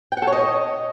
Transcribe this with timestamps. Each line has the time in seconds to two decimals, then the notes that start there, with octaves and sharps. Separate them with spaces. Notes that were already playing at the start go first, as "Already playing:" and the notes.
0.12 G5
0.17 F#5
0.22 A4
0.27 C#5
0.32 D#5